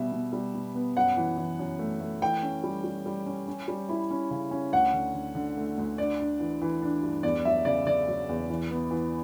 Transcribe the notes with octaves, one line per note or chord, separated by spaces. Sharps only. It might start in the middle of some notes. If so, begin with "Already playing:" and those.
Already playing: B2 G3 E5
B2
G3
B2
B3
F#2 F#5
E3
E3
F#2
A3
A3
E3 G5
C#4
G3
G3
G3
C#4
C#4
G3
E4
C#4
C#3
C#4
D2 F#5
D3
D3
D3
A3
D2
D4 D5
D4
E3
E3
D4
G2
E2 D5
F#3 E5
C#3 D5
C#3 D5
F#3
E2
E3
B3
E3